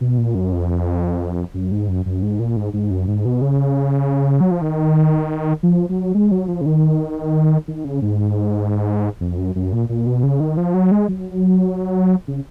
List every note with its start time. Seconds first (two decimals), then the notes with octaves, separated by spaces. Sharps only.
0.01 B2
0.18 A#2
0.35 F#2
0.52 F2
1.54 F#2
1.71 G#2
1.88 F#2
2.06 F#2
2.22 G#2
2.39 A#2
2.57 G#2
2.73 G#2
2.90 F#2
3.07 G#2
3.25 B2
3.41 C#3
4.41 F#3
4.51 F3
4.61 D#3
5.63 F3
5.89 F#3
6.14 G#3
6.31 F#3
6.48 F3
6.61 C#3
6.66 D#3
7.68 D#3
7.84 C#3
8.02 G#2
9.21 F2
9.38 F#2
9.55 F#2
9.73 A#2
9.89 A#2
10.06 B2
10.23 C#3
10.40 D#3
10.57 F3
10.74 F#3
10.91 G#3
11.08 F#3
12.28 C#3